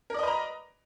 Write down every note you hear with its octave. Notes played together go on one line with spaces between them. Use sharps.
A#4 B4 D5 D#5 A#5